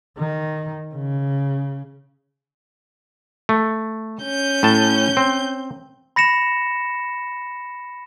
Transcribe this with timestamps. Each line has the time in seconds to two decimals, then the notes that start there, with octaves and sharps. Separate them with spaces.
0.18 D#3
0.95 C#3
3.49 A3
4.22 C#4 G6
4.63 A2 A5
5.17 C4
6.16 B5 A#6 C#7 E7